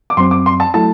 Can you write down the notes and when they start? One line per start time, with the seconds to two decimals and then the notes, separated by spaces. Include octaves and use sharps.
0.10 D6
0.17 F#2 F#3 C4 C6
0.31 D6
0.46 C6
0.60 A5
0.74 F#3 A3 E4 A5